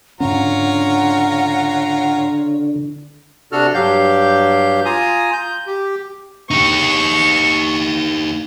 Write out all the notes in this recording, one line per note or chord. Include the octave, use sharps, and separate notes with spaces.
G#2 D3 C#4 F4 C#5 F#5 A#5
C3 D4 F#4 A4 F6
G2 F#3 G4 F5 G6
F4 G#5 A#5 D#6
G6
G4
D#4 G4 C#6